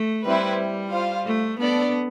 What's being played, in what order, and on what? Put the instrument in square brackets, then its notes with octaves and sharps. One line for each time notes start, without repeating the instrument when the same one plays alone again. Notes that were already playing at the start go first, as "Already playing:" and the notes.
Already playing: [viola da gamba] A3
[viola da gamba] G3 [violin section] C4 E4 B4
[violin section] F4 C5 F5
[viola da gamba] A3
[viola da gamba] B3 [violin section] D4 A4 D5